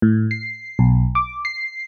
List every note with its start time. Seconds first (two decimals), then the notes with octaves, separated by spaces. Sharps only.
0.02 A2
0.31 C7
0.79 B1
1.15 D6
1.45 C7